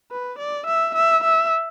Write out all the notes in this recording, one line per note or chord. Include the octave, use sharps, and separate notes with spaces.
B4
D5
E5
E5
E5